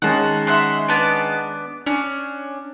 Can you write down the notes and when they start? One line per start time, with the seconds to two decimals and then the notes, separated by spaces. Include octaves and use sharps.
0.02 D#3 G#3 C#4 F#5 A5
0.47 E5 F#5 C6
0.88 B3 D4 D5
1.86 C#4 D4